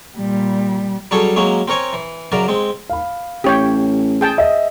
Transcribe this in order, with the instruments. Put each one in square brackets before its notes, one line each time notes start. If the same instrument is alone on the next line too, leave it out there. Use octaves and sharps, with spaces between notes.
[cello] A#2 G3
[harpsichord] F#3 G3 C#4 G#4 A4 C#5
F#3 G#3 A#3 C#4
C4 A#4 C#5 G#5
E3
F#2 C#3 F#3 A#4 D5
G#3 C4
[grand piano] F5 B5
[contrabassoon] A1 [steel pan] G4 C#5 G5
[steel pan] G#4 G5 A5
[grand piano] D#5 E5